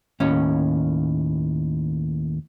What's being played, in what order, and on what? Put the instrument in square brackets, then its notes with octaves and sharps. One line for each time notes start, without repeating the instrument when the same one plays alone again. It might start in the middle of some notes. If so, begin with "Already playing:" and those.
[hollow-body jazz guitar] D#2 A2 C#4